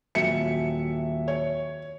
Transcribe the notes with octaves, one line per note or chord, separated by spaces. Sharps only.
D#1 F#3 E5 C#7
C#5